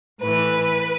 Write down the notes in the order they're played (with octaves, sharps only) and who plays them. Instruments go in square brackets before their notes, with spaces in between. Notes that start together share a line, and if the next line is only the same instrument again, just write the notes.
[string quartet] A2 E3 B4